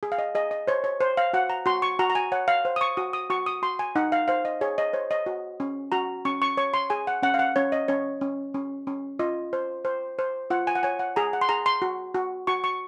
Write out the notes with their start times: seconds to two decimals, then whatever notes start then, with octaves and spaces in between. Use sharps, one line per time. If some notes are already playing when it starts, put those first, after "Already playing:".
0.03 G#4
0.12 F5
0.18 D#5
0.35 G#4 D#5
0.51 D#5
0.67 C5 C#5
0.84 C#5
1.01 C5
1.17 F5
1.33 F#4 F#5
1.50 A#5
1.66 F#4 C6
1.82 C#6
1.99 F#4 A#5
2.10 A#5
2.15 G#5
2.32 C#5 F#5
2.48 F5
2.65 C5
2.76 D#6
2.81 C#6
2.97 F#4 D#6
3.13 D#6
3.30 F#4 C#6
3.46 D#6
3.62 F#4 C6
3.79 G#5
3.96 D#4 F#5
4.12 F5
4.28 C5 F5
4.45 D#5
4.61 G#4 C#5
4.78 D#5
4.93 C5 C#5
5.11 D#5
5.26 F#4
5.60 C#4
5.92 F#4 A#5
6.25 C#4 C#6
6.42 C#6
6.57 C#5 C#6
6.74 C6
6.90 G#4 G#5
7.07 F#5
7.23 C#4 F#5
7.34 F5
7.39 F#5
7.56 C#4 C#5
7.72 D#5
7.88 C#4 C#5
8.21 C#4
8.54 C#4
8.87 C#4
9.19 F4 D#5
9.53 C5
9.85 C5
10.19 C5
10.50 F4 F#5
10.67 G#5
10.75 F#5
10.83 C#5 G#5
10.99 F#5
11.16 G#4 A#5
11.33 F#5
11.41 C6
11.49 G#4 A#5
11.66 C6
11.82 F#4
12.15 F#4
12.47 F#4 C#6
12.64 C#6